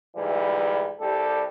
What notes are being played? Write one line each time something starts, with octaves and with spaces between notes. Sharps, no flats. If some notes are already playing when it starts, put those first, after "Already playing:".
D2 G#2 E3 G3
C2 G3 G4 A4